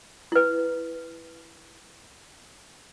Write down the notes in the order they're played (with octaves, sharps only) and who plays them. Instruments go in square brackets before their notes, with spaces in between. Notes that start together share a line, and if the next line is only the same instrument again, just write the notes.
[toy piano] E4 B4